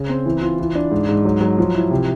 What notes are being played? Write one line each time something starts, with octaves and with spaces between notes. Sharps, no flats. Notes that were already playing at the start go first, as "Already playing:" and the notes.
Already playing: C#3
C4
E3
F4
E3
D4
G#2
G#2
F#3
F#3
F3
E4
C3